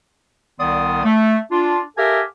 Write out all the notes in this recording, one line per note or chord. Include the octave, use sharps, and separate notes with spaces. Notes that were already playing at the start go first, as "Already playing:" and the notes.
C2 D#3 B3 D5 C6 D#6
A3
D4 F4
G4 A4 A#4 E5 F5 G#5